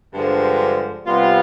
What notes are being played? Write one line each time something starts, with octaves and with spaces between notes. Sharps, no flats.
G2 D3 F3 G#3
C3 G3 B3 F4